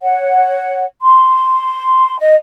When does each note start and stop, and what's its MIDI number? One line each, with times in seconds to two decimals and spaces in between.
0.01 0.84 73
0.01 0.84 78
1.02 2.17 84
2.20 2.34 75